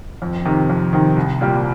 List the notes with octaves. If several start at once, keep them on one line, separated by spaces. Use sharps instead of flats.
F2
C3 D#3
F2
C3 D#3
C2
A#2 G3 A#3 G4